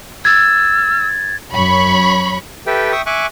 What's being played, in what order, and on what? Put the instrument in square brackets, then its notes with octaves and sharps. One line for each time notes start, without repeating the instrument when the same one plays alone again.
[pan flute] E6 [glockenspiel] G#6 A6
[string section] F#2 C#5 B5 C#6
[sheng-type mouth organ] G4 A4 B4 E5 G5
E5 G5 C#6 D#6
E5 G#5 C#6 D6 F#6